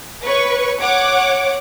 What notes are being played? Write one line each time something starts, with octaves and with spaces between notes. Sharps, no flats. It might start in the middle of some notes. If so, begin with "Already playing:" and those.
B4 C#5 C#6
C#5 F#5 D6